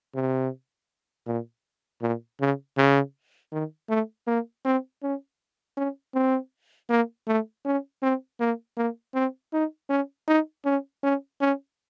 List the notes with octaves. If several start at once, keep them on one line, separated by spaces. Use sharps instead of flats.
C3
A#2
A#2
C#3
C#3
D#3
A3
A#3
C4
C#4
C#4
C4
A#3
A3
C#4
C4
A#3
A#3
C4
D#4
C#4
D#4
C#4
C#4
C#4